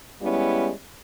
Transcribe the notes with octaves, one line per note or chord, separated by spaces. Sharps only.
G3 G#3 B3 C#4 E4